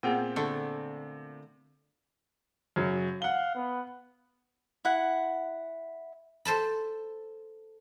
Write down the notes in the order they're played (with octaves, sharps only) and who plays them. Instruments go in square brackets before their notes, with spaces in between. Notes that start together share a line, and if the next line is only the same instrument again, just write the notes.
[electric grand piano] A#2 C4 G5 [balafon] B3 G#4 F#5
[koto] D3 A3
[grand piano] F#2 C#3 F#3
[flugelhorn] F5 [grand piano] F#5 G7
[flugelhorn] B3
[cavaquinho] E4 F#5
[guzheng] A4 C5 A5 B5